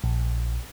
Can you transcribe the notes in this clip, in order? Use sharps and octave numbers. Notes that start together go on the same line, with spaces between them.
A#1